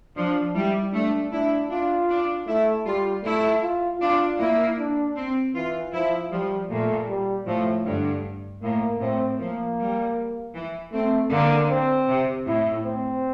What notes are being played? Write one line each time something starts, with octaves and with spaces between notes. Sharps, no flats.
F3 D4
G3 E4
A3 D4
D4 E4
D4 F4
D4
A3 E4
G3 F4
A3 E4
F4
D4 F4
A#3 E4
D4
C4
E3 F4
F3 E4
F3 G3
A#2 A3
G3
A2 F3
G2 D3
A2 A#3
A2 C4
F3 A#3
G3
E3
A3 C4
D3 A#3
C4
C3
A2 E4
C4